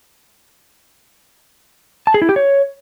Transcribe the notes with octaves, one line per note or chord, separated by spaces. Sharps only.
A5
G#4
E4
G4
C#5